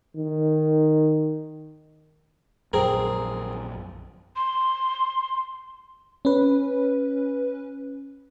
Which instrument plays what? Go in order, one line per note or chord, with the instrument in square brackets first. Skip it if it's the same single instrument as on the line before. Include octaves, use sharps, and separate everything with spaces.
[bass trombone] D#3
[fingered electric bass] A#1 F#2 [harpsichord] C4 G#4 A#4
[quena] C6
[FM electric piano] C#4 B4